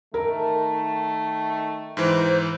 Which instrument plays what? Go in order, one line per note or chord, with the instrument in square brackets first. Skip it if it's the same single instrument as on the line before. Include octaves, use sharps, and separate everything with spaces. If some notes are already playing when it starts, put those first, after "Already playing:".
[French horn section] D#3 A3 [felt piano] A#4
[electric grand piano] G#2 E3 [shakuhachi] C5